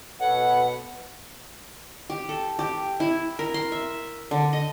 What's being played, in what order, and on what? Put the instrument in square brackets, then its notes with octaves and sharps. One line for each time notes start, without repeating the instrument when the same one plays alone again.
[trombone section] B2 [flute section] A4 B4 C#5 [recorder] F#5
[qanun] G4
A4
G4
E4
A#4
C6
E5
D3
D#5